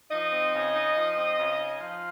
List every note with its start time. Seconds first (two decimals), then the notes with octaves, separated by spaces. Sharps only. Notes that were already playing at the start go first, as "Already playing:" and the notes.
0.11 F3 D#4 D#5
0.32 C4
0.53 C#3
0.75 D#4
0.95 F3
1.17 C4
1.38 C#3
1.58 D#4
1.79 F3 F4 F5